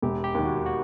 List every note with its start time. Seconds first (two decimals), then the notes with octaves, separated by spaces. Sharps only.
0.02 E1 G4
0.24 G4
0.34 D#2 D#3
0.45 F#4
0.66 F#4